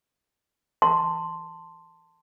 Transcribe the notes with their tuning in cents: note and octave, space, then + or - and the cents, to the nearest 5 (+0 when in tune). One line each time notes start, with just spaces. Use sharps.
A5 +20 C6 +0